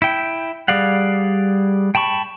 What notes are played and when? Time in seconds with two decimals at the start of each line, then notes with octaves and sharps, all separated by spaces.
0.02 E4 G5
0.68 G3 G#4 D5 F5 F#5
1.95 G5 A5 B5 C#6